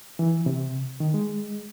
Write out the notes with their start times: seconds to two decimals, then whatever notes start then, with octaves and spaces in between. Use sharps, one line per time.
0.19 E3
0.46 C3
1.00 D#3
1.14 G#3